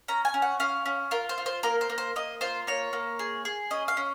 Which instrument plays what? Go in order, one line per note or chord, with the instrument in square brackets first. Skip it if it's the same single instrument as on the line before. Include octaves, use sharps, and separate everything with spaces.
[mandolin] C#4 A#5
G#5
C#4
F#5
C#4 F5
C#4
F4 A#4
C5
F4
C5
A#3 A#4
C5
A#3
C5
A#3 D#5
F4 C5
A#3 C#5
A#3
G#4
G#4
C#4 D#5
F5
C#4